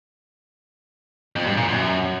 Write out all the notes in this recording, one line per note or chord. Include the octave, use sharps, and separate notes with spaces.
F2
G2
A#2
F#2